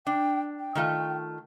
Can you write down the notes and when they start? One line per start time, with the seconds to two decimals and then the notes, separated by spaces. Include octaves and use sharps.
0.07 D4 G5
0.59 G5
0.75 D#3 A3 F4